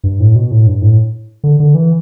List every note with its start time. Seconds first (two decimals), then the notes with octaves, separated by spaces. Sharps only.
0.04 G2
0.20 A2
0.35 B2
0.51 A2
0.67 G2
0.82 A2
1.44 D3
1.60 D3
1.75 E3